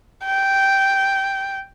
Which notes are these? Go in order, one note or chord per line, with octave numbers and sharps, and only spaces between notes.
G5